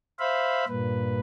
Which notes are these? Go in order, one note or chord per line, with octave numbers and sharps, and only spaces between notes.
C5 E5 F5 B5
G2 A#2 B4